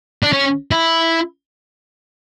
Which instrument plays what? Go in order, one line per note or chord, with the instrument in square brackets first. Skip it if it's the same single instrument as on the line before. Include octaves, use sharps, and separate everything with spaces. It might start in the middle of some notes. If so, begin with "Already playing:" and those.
[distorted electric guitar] D4
C#4
E4